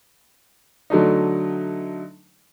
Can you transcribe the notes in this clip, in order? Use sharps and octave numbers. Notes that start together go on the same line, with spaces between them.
D3 F#3 A3 D#4